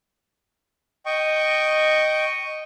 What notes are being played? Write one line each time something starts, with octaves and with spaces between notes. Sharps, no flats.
D#5 G5 C#6